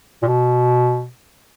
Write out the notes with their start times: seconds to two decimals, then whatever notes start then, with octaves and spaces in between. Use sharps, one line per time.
0.22 A#2
0.27 B2